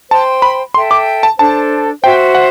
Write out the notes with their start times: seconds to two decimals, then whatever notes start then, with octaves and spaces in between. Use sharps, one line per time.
0.10 C5 G5 A5 C6
0.42 B5
0.74 A4 E5 G5 C6
0.91 D6
1.23 A5
1.39 D4 A4 C5 A5
2.04 F#4 C5 E5 G5
2.35 F#5